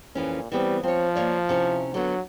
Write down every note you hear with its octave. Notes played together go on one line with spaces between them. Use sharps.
F2 A#2 E3 C#4
E3 G3 B3 C4
F3 C4 C#5
A#3 C#5 D5
C3 C#4 E4
D3 F#3 B3